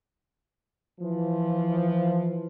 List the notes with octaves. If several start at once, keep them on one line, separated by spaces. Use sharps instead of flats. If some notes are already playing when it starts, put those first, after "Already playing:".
E3 F3